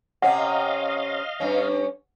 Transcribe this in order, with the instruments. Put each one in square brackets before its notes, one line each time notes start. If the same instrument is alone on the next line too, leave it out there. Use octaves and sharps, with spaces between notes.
[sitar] C3 C#4 [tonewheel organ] D#5 F5 [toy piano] F#5
[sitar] G2 C#4